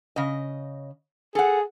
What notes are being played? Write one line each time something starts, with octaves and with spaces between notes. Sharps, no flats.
C#3 D#5
G#4 A4 F#5